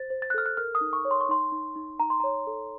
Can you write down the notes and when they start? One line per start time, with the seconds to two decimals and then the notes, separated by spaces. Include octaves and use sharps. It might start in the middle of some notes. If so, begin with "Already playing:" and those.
Already playing: C5 A6
0.10 C5
0.22 A6
0.30 F#6
0.34 A4 F6
0.46 F#6
0.57 A#4 F6
0.75 D#6
0.81 D#4
0.93 C#6
1.05 C#5
1.11 C6
1.21 C#6
1.29 D#4 C6
1.52 D#4
1.76 D#4
2.00 D#4 A#5
2.10 C6
2.20 C#5 A#5
2.47 A4